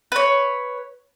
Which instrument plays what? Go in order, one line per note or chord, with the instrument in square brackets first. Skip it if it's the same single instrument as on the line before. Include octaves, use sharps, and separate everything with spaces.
[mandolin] B4 C#5